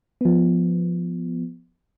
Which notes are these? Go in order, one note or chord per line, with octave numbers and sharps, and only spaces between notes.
F3 B3